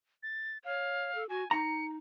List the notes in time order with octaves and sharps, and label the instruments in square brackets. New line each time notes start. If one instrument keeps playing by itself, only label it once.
[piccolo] A6
[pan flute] C#5 [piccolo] F5
[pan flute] A4
[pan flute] F#4 [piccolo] G#5
[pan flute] D#4 [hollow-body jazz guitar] A#5 [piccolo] C#7